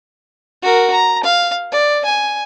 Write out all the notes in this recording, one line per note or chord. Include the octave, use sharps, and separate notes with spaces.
F#4 A#4
A#5
F5
D5
G#5